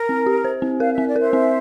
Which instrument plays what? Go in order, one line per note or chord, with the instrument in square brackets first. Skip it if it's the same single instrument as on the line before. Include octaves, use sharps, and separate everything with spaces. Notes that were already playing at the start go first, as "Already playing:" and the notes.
Already playing: [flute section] A#4
[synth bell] C4
G4
C5
C4
[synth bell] A#4 [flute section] F5
[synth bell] C4 [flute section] E5
[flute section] D5
[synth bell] A#4 [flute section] C5 E5
[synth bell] C4